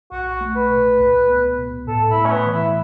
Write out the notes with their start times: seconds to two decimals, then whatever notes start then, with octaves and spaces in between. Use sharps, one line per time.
0.12 B1 F#4
0.41 A3
0.56 B4
0.70 B2
1.00 C#2
1.29 B3
1.58 B2
1.87 A2 A4
2.10 E4
2.17 A3
2.25 C#4
2.31 B3
2.46 E3
2.53 E4